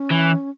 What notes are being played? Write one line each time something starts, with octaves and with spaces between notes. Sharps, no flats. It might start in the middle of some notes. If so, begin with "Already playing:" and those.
Already playing: C#4
E3